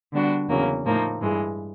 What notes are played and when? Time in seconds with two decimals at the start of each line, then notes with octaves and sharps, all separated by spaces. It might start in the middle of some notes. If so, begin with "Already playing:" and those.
0.12 D3 G3 B3 D4 F#4
0.49 E2 C#3 F#3 A#3 C#4
0.84 A2 F3 A#3 D#4
1.21 G2 E3 G#3